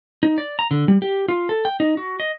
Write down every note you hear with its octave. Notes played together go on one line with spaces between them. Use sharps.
D#4
D5
A#5
D3
G3
G4
F4
A4
G5
D#4
F#4
D#5